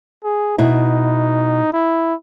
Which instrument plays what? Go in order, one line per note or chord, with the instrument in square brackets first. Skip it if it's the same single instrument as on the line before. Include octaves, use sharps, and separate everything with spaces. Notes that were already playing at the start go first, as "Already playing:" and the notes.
[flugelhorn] G#4
[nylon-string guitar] B2 E4 [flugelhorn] D#4
[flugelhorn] E4